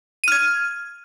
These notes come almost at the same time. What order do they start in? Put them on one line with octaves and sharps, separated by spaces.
D#7 F6 G#6